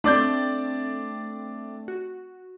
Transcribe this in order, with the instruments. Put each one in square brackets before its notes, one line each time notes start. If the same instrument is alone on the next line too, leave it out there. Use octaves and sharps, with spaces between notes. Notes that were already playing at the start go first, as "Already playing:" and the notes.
[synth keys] A3 C4 [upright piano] D4 D5 G6
[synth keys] F#4